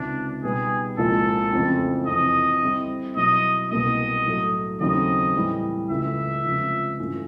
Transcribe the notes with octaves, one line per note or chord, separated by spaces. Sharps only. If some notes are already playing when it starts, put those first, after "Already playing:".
Already playing: C#2 C3 D#3 D4
B2 G3 B3 D#4 G#4
C2 A#2 F3 G#3 A4
F2 C#3 E3 A3 C4
F2 C3 E3 D#5
D3 G3 C4 E4
B2 F#3 B3 E4 D#5
C2 B2 G3 A#3 D#5
A2 F#3 A3
D#2 C#3 F#3 A3 C4 D#5
A2 E3 G3
C#2 C#3 E3 A3 E5
C#2 C3 F3
G2 E3 A3 C#4 F4